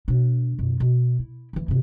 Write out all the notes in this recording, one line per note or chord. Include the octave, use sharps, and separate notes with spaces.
B2 D4
F#2 B2
B2
E4
D2 E3
G2 C3